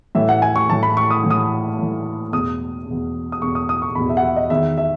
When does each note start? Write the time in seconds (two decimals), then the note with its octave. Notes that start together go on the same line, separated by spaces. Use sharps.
0.15 A2 E3 E5
0.29 F#5
0.42 G#5
0.56 C#6
0.69 A2 E3 A5
0.83 B5
0.97 C#6
1.11 D#6
1.24 A2 E3
1.30 D#6
1.79 A2 E3
2.32 E2 B2 D#6
2.87 E2 B2
3.32 D#6
3.42 E2 B2 C#6
3.55 D#6
3.69 D#6
3.82 C#6
3.95 E2 B2 B5
4.09 E5
4.17 F#5
4.23 E5
4.36 D#5
4.50 E2 D#3 E5
4.78 E5